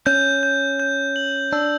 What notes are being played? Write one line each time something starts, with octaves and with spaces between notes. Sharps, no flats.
C#4 G6
G6
G6
F#7
D4 E6